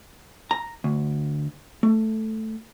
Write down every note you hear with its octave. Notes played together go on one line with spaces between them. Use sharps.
A#5
D2
A3